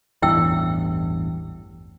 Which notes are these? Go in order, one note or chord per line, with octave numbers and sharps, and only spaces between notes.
A1 E2 G2 E4 G5 E6